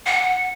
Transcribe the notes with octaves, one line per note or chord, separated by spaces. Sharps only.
F#5